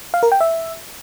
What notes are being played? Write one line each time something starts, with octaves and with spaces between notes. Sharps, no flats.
F5
A#4
G5
E5